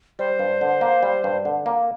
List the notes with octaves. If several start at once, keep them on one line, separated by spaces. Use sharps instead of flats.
G3 C5
G2
D3
A#3
G3
G2
D3
A#3